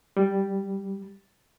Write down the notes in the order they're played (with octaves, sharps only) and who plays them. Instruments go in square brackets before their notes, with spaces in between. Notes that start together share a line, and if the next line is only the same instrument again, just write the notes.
[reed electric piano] G3